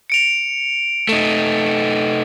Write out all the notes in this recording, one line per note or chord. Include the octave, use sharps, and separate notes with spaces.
C#7 D7 F7
A3 D#4